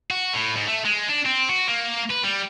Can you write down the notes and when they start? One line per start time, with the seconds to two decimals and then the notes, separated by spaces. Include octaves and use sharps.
0.11 F#4
0.34 A2
0.56 G#2
0.68 A3
0.85 G#3
1.09 D4
1.26 C4
1.49 F#4
1.68 A#3
2.10 B4
2.24 G3